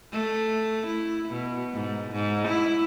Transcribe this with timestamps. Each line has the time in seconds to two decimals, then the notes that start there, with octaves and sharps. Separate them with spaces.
0.12 A3
0.86 E4
1.29 B2
1.73 G#2
2.11 G#2
2.48 E4